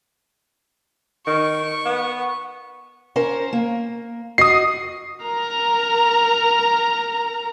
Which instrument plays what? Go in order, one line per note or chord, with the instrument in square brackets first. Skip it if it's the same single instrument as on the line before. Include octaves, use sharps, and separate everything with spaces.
[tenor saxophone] D#3 [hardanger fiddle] C#6
[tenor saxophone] B3
[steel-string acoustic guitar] C#4 A#4 C5
A#3
[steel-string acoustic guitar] F#4 D#5 [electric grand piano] D#6 C7
[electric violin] A#4 A#5